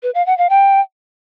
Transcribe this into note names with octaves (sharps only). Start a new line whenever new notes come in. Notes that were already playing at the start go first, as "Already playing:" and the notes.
B4
F5
F#5
F5
G5